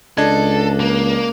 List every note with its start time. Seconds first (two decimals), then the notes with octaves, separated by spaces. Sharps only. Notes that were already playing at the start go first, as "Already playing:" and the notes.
0.18 C#2 D4 A4 D#5 G#6
0.80 A#3